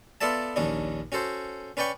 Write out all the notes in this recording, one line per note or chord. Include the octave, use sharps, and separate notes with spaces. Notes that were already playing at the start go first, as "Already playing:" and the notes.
B3 F4 A4 D5 E5 A5
A#1 D#2 C#4 D4
C#4 F#4 A4 C5
C#4 B4 D5 G5 C#6